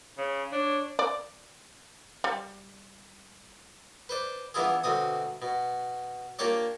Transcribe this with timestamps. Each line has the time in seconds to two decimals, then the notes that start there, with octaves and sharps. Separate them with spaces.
0.18 C#3
0.52 D4 C#5
0.99 D5
2.24 G3
4.09 B4 C5 D5
4.54 E3 B3 D4 E4 F4 G#4
4.84 D2 B2 C4 D#6
5.42 B2
6.39 A#3 D4 F4 G4 C#5 D5